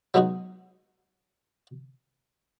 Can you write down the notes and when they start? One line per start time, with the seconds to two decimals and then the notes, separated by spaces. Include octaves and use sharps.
0.14 F#3 G#3 B3 D#4 F#4